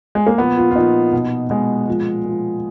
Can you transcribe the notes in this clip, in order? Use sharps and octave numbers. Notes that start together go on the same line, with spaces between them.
G#3
A#3
A#2 F3 B3
F4
F4
A#2 F3 D#4
B2
B2 G#3
A#2 F3
A#2 F3